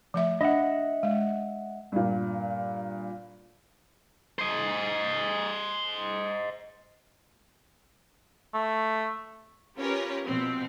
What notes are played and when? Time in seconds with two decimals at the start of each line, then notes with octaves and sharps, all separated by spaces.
0.14 F3 A3 E5
0.41 D4 D#5 E5 F#5
1.03 G#3
1.92 G2 A#2
4.39 C5 D#5
8.54 A3
9.77 C#4 F4 G4 A#4 B4 C#5
10.26 B2 F3 C4